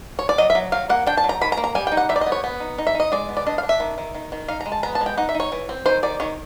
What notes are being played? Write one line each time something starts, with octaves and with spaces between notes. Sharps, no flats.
C#5
D5
F#3 D#5
E5
F#3
F#3 F5
A#3 F#5
D4 G5
A5
F#3
A#5
D#3 B5
A#5
A#3
A#5
G3 G#5
G5
D#4
F#5
G3 E5
D5
D#5
B3
C#5
B3
D#4
D#4
E5
D#4 D#5
G#3 D5
B3
D5
D4 D#5
F5
D4
E5
D#3
D#3
D#3
D#3
D#4 F5
A#5
G#3
A5
B3 A#5
A5
G#3
G5
D#4 F#5
E5
D#4
C#5
E3
C4
D#3 C5
D#3 D5
D#3 C#5